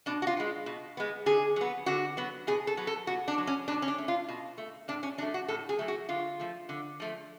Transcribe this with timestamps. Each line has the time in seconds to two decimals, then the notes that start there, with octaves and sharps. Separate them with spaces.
0.06 B2 D4
0.22 F#4
0.27 F4
0.37 G#3 B3
0.66 B2
0.97 G#3 B3
1.26 D3 G#4
1.56 F#3 B3
1.86 D3 F#4
2.17 F#3 B3
2.47 B2 G#4
2.67 A4
2.77 F#3 B3
2.87 A4
3.07 B2 F#4
3.28 D4
3.38 F#3 B3
3.47 C#4
3.68 B2 D4
3.82 C#4
3.88 D4
3.98 A3
4.08 F4
4.28 B2
4.58 A3
4.88 A2 D4
5.03 C#4
5.18 F#3 D4
5.22 A3
5.34 F#4
5.48 A2 A4
5.69 G#4
5.79 F#3 A3
5.88 F#4
6.09 D3 F4
6.39 F3 A3
6.69 D3
7.00 F3 A3